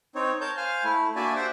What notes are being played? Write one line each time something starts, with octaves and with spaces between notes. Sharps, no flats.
C4 D#4 C#5
A#4 C#5 A5 G6
C5 F5 G#5 F6
A3 E4
A#3 D4 F#4 D5 E5 G#5
G4 C5 E5 F#5 G5